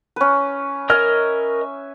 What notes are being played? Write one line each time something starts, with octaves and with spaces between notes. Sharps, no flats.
C#4 B4
A#4 D#5 E5 G#5 F6